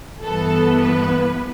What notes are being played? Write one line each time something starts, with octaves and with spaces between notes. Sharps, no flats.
G2 E3 B3 A4
B4